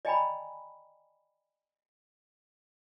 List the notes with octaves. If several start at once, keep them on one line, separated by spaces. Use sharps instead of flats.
D5 D#5 G5 G#5 A#5 B5